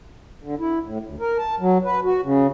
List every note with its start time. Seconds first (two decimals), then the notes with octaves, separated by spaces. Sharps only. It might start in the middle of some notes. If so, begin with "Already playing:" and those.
0.43 D3
0.60 E4
0.83 A2
1.04 D2
1.20 A#4
1.38 A5
1.60 F#3
1.85 B4
2.04 F#4
2.23 C#3